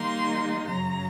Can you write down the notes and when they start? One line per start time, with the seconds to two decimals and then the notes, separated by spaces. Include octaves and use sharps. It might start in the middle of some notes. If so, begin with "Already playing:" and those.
Already playing: D#3 G3 A#3 D#4 C6
0.68 F#2 C#3 F#3 A#5